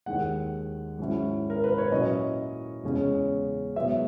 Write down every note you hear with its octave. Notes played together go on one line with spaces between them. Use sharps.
D#2 D#3 G#3 F#5
G#2 F#3 C#4 E4
A#4
B4
C#5
A#2 F#3 C#4 E4 D#5
E2 C#3 G#3 C#4
G#2 F#3 B3 E5